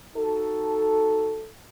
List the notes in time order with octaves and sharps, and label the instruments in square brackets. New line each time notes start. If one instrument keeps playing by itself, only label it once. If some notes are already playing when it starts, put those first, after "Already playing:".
[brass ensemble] D#4 F#4 A4